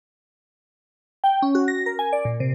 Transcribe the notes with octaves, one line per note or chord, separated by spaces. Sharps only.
G5
C#4
F#4
A#6
A#4
G#5
D5
A#2
C3